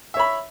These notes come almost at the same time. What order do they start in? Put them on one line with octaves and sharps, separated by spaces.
E5 C#5 B5